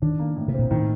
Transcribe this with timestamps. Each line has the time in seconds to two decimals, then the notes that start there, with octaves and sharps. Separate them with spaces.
0.02 D#3 D4
0.19 A#3
0.36 A2
0.48 C3
0.54 C4
0.59 A#2
0.71 A2 D#3